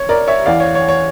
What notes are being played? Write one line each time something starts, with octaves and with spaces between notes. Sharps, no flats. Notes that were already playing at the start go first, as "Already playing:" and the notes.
Already playing: C#5
A#4 D5
C#5 E5
E2 E3 D5 F5
C#5
C#5
C#5